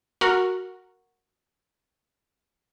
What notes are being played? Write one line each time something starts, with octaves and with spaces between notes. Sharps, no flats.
F#4 A#4